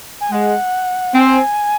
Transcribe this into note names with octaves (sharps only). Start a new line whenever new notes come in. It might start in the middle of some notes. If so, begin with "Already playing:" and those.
G#5
G#3 F#5
C4 G#5